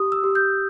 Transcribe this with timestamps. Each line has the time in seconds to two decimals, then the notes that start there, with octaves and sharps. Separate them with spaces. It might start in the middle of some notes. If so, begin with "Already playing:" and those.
Already playing: G4 D#6
0.12 E6
0.24 G4
0.35 G6